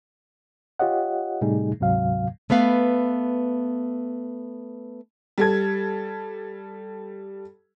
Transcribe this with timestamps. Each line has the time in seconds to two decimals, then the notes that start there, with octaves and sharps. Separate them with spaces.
0.79 F4 G4 C#5 D#5 F#5
1.41 A2 C3 G3 A3 D#4 G#4
1.80 D2 G#2 C3 F#3 F5
2.50 A3 B3 B4 F5
5.38 G3 A4 G#6